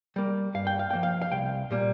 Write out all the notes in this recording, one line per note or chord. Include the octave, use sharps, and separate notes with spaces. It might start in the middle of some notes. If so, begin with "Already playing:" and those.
G3 A#3
G2 F5
G5
F5
F3 A#3 G5
F5
F5
C2 G5
A#2 G3 A#3